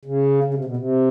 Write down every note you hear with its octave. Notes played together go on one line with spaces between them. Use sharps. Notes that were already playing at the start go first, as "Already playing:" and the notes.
C#3
C#3
C3
B2
C3